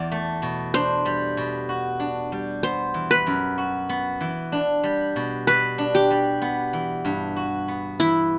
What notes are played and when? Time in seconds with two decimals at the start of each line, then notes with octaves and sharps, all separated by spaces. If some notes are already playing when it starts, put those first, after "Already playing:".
Already playing: E2 D5
0.12 A3
0.42 B2
0.74 D4 C5
1.05 G3
1.37 B2
1.69 F#4
2.00 D4
2.32 G3
2.63 B3 C5
2.94 E3
3.11 B4
3.27 F#2
3.58 F#4
3.89 B3
4.21 E3
4.52 D4
4.83 G3
5.16 B2
5.47 B2 B4
5.78 D4
5.95 G4
6.10 G3
6.42 B3
6.73 E3
7.05 G2
7.36 F#4
7.68 B3
8.00 E3 E4